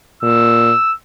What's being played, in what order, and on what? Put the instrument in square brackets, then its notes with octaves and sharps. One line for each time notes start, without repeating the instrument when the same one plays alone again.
[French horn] A#2 [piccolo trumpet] E6